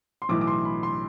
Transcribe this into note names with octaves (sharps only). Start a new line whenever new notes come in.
C6
B1 A2 E3 D6
D6
C6
B5
C6